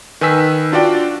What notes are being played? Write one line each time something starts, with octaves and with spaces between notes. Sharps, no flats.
D#3 B4 G#5 E6 B6
D4 F4 F#4 D5 G5